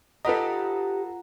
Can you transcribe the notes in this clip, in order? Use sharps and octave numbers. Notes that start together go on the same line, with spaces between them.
D#4 F4 G4 A4 B4 D#5 F#5 A#5